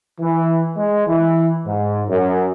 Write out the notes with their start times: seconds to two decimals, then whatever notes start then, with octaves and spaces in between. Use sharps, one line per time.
0.20 E3
0.77 G#3
1.07 E3
1.66 G#2
2.08 F#2